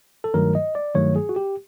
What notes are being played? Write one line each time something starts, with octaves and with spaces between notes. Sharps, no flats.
A4
G2 D#3 F#3 A3 A#4
D#5
D5
G2 D#3 F#3 A3 C#5
G#4
F#4
G4